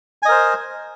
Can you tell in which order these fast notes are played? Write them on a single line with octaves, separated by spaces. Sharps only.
G#5 D#5 A#4 C5